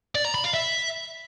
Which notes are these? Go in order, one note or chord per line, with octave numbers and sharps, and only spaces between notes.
D5
A#5
B5
F5
E5